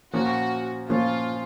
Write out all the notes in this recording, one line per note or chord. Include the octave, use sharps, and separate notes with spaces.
A#2 F3 A#3 C#4 F#4
A#2 F3 A#3 C#4 F4